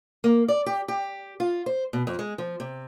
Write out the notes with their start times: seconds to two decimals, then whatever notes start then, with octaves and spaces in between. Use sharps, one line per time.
0.24 A#3
0.48 D5
0.66 G4
0.88 G4
1.40 F4
1.66 C5
1.93 B2
2.07 F2
2.19 G#3
2.38 F3
2.60 C3